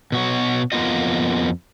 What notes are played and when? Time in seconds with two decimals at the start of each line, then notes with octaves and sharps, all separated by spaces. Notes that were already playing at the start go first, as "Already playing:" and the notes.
0.12 B2 F#4 C#5
0.72 F2 A#3 B3 F4 F#4 D#5